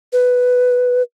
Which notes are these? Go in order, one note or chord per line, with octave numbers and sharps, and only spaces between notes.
B4